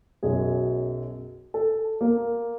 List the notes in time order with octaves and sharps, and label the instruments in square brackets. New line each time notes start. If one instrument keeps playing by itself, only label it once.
[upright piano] B1 F#2 G#4
A4
A#3